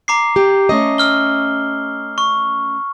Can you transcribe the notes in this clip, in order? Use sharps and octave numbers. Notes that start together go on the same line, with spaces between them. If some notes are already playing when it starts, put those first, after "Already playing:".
A#5 D6 C7
G4
A3 C#4 D#5
E6 F6 G7
C#6